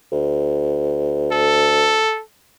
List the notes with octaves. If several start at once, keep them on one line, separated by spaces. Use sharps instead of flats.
D2
A4